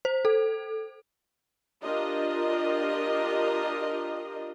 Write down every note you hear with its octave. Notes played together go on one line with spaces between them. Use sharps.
C5
A4
D4 F4 G4 A#4 D#5